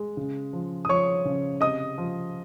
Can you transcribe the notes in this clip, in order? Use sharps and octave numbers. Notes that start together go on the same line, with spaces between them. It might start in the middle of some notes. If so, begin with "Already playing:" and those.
Already playing: G#3
C#3
F3
D#6
F3 C#5 C#6
C#3
C3 D#5 D#6
F3